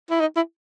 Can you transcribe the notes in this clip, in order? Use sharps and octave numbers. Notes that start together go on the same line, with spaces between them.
E4
D#4
E4